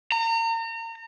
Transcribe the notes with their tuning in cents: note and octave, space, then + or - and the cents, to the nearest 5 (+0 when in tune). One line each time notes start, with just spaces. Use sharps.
A#5 -35